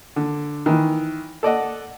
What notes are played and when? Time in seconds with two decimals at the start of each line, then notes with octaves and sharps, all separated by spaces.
0.16 D3
0.66 D#3 E3
1.43 A4 D5 D#5 F#5